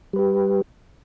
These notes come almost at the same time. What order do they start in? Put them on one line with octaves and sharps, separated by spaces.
G3 B4 G4